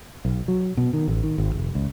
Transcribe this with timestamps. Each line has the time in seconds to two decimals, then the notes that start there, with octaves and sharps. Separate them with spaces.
0.25 B1
0.48 F#3
0.77 B2
0.93 D#3
1.08 A1
1.23 D#3
1.38 G#1
1.55 F1
1.75 C#2